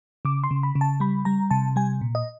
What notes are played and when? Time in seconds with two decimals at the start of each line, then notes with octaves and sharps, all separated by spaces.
0.25 C#3 D6
0.44 C6
0.51 C#3
0.63 B5
0.75 C#3
0.81 A5
1.00 G3 B5
1.25 G3 A#5
1.51 C3 A5
1.76 G3 G#5
2.01 A#2
2.15 D#5